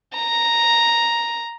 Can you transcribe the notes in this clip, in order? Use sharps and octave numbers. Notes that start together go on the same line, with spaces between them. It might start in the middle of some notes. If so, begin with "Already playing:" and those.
A#5